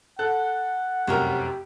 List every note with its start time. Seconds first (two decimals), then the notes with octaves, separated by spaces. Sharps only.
0.19 A4 F#5 F#6
1.07 F1 C2 F#2 G4 A#4 C5 C#5